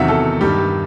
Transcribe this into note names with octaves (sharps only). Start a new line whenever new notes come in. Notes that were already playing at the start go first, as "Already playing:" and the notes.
Already playing: E2 C3 D#3 F#3 E5 F#5
A4
G2 D#3 G3 G4